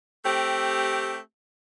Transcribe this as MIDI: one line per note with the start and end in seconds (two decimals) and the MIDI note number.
0.24 1.17 57
0.24 1.17 60
0.24 1.17 67